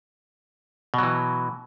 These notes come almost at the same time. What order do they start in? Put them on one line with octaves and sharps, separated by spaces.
B2 F#3 E3